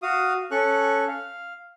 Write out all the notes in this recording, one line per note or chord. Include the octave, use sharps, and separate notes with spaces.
F#4 F5 D#6
C#4 A4 C#6 F#6
F5